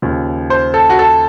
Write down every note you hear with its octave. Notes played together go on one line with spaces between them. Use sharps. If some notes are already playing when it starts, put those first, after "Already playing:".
D#2 C#3 F3
C5
A4
F#4
A4